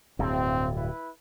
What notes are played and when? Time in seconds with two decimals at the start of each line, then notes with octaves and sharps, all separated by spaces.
0.19 D1 G2 C4
0.74 E4 B4